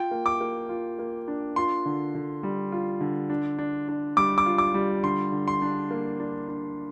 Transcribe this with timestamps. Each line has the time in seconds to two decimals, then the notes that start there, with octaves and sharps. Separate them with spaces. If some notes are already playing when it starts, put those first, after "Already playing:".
Already playing: F4 G5
0.11 A#3
0.26 D6
0.41 A#3
0.69 F4
0.99 A#3
1.28 D4
1.56 F4 C6
1.86 D3
2.15 D3
2.43 G3
2.72 F4
3.00 D3
3.30 D4
3.58 D4
3.89 D4
4.17 G3 D6
4.38 D6
4.46 F4
4.58 D6
4.74 G3
5.03 D3 C6
5.32 D3
5.48 C6
5.62 D4
5.91 A#3
6.20 D4
6.48 D4